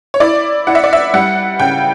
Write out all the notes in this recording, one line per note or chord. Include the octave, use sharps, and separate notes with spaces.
C#5
E4 D5
E4 F#5
E5
D5
E5
G3 F#5
C#3 G5